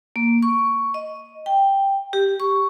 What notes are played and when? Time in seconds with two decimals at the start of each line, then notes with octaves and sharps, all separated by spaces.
0.16 A#3
0.43 C#6
0.94 D#5
1.46 G5
2.13 G4
2.40 C#6